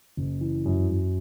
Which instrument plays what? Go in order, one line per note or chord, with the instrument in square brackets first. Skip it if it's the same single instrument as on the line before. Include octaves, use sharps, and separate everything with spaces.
[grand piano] F#1
E3
F#2
F#2